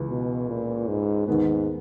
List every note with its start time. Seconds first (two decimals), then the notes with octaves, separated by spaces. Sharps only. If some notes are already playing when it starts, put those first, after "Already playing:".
Already playing: C#2 C#3 E3
0.10 B2
0.49 A#2
0.88 G#2
1.27 D#2 G#2 D#3 G#3 B3